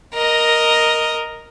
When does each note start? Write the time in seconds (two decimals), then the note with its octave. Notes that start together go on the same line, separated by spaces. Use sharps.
0.14 A#4 D#5